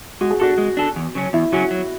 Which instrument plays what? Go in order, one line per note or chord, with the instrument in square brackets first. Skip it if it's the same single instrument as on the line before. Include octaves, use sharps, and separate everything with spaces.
[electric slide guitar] G#3 [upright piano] F#4
[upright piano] G#4
[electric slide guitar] D4 A4 [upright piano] F#4
[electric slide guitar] G#3
D4 A4
E2
C#3 F#3 C#4
[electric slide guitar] E2 [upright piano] E4
[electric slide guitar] C#3 F#3 C#4 [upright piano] F#4
[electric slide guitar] F#3